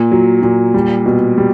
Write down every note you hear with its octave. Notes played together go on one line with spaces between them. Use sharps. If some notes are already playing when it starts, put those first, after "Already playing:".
Already playing: A#2
F#3
A#2
G3
B2
G3